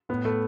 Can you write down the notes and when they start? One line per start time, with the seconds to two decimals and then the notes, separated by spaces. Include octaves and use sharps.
0.09 A2 B3
0.25 A3